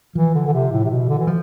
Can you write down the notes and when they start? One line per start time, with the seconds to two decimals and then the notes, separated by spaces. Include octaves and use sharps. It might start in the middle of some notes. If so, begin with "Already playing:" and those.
0.15 E3 F3
0.34 D3
0.47 D3
0.53 C3
0.71 A2
0.85 C3
0.90 B2
1.09 D3
1.19 E3
1.27 F3